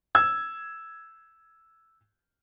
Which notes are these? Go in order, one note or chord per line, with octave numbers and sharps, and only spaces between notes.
E6 G#6